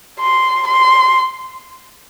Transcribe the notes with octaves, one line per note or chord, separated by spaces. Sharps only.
C6
C6